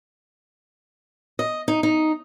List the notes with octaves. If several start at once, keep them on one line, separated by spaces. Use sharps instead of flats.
D#5
D#4
D#4